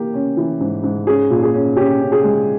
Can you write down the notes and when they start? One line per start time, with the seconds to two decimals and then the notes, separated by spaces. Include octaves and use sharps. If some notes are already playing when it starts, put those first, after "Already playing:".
Already playing: E3 A#3 G4
0.14 C#4
0.37 E3
0.60 G#2
0.83 G#2
1.07 C#4 G#4
1.30 A#2
1.43 G#4
1.54 C#4
1.77 C#4 G4
2.01 C#4
2.12 G#4
2.24 G#3